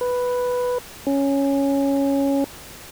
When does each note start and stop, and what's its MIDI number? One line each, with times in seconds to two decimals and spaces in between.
0.01 0.78 71
1.07 2.44 61